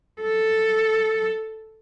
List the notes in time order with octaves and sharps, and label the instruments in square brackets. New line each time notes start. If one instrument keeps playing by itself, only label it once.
[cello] A4